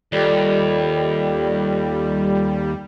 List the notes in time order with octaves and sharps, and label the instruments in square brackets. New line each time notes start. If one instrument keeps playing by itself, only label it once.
[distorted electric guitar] D#2 [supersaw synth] G3 [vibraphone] F4 A4 D5